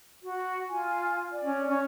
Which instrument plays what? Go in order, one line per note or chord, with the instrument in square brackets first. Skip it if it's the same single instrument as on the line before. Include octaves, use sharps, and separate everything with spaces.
[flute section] F#4
F4 G#5
D5
[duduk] C#4
[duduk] C#4 [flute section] C#6